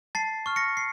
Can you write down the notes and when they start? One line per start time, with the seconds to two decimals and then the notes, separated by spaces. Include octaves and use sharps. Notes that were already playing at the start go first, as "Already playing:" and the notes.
0.15 A5 A6 C7
0.46 C#6 F6
0.56 A#6 C#7
0.77 C7